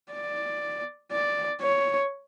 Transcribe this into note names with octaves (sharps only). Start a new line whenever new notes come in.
D5
D5
C#5